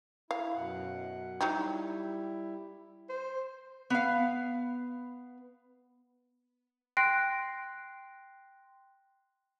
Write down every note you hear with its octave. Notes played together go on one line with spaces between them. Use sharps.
E4 F5
F#2 B2 F#5
F#3 G3 D#4 E4 G4
C5
B3 F5
G5 C6 F#6 A#6 C7 D7